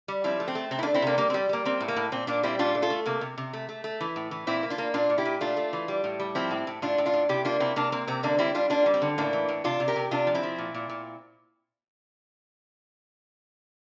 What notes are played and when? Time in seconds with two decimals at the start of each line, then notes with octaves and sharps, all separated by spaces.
0.08 G3
0.24 F3 C4 E4
0.40 A3
0.48 C4
0.55 A3
0.71 C3 C4
0.79 E4
0.83 A#3 D4
0.87 A3
0.94 C4 E4
1.02 C3 A#3 D4
1.18 G3 A#3
1.30 C4
1.34 G3
1.49 G3 A#3
1.65 A#3 C4
1.80 A2
1.88 A#3
1.96 A2
2.12 A#2 C4
2.27 A#2 A#3 D4
2.43 G3 C4 E4
2.59 A#2 D4 F4
2.75 A3
2.82 F4 A4
2.90 A3
3.06 C3 A#3
3.21 C3
3.38 C3
3.53 A3
3.69 A3
3.84 A3
4.01 E3
4.16 A2
4.31 E3
4.47 A#2 C4 E4
4.63 A#3
4.70 D4 F4
4.78 A#3
4.94 A#2 D4 F4
5.10 A#2
5.18 E4 G4
5.25 A#2
5.41 A3 D4 F4
5.57 A3
5.73 E3
5.88 G3
6.04 A2
6.20 G3
6.35 F3 C4 E4
6.51 A2
6.67 A2
6.82 A2 D4 F4
6.98 A2
7.06 D4 F4
7.14 A2
7.29 C3 E4 G4
7.45 A#3 D4 F4
7.60 C3 C4 E4
7.76 C3 A#3 D4
7.92 A#3 C4
8.07 C3 C4
8.23 D3 A#3 D4
8.38 G3 C4 E4
8.55 G3 D4 F4
8.70 A#3 D4 F4
8.86 G3
8.94 C4
9.02 D3
9.18 A2 A#3 D4
9.33 E3
9.49 A2
9.64 C3 D4 F4
9.80 C3
9.88 G4 A#4
9.96 C3
10.11 C3 D4 F4
10.27 F3
10.34 C4 E4
10.43 F3
10.58 A#2
10.74 A#2
10.89 A#2